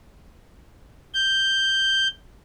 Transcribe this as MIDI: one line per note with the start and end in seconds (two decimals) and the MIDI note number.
1.13 2.07 91